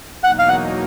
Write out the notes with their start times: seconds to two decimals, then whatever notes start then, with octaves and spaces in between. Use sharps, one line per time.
0.24 E2 B2 F#3 A#3 D#4 F#5
0.39 F5
0.49 F#5